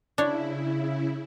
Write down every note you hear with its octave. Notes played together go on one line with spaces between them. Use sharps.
C#3 D4 E4 C#5